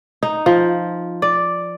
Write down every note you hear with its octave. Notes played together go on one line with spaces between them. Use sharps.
D#4
F3
D5